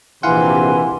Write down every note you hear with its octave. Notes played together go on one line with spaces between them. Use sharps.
A#1 C3 E3 E4 F5 F#5 G#5 C6